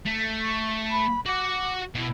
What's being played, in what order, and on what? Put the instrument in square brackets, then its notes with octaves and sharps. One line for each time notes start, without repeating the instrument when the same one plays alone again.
[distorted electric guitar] A3
[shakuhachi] C#6
B5
[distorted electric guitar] F#4 F#5 [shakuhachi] D6
[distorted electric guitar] B2 [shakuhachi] E4